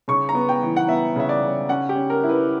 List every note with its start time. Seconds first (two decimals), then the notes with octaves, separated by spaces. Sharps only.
0.08 C#3 C#6
0.29 A#5
0.35 B3
0.49 G5
0.63 E3
0.76 F#5
0.88 B3 E5
1.16 C#3 E5
1.29 D5
1.43 C#3
1.69 C#4 F#5
1.89 G4
1.96 C#4
2.10 A#4
2.24 E4
2.29 B4